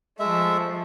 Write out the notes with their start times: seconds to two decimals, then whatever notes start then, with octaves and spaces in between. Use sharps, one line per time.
0.19 F3 G#3 A3 E5